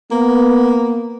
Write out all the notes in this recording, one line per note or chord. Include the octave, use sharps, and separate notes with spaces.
A#3 B3